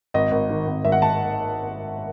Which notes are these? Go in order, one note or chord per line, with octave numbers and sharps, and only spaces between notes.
G#1 D#5
G#1
D#3
G#1
G#1 E5
F#5
A5